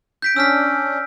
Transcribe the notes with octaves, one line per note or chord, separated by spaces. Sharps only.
G6 B6 D7
C#4 D4 E6 F6 B6